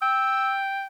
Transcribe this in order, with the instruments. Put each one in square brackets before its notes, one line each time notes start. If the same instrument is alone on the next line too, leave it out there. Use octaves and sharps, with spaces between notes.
[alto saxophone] G5 [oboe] E6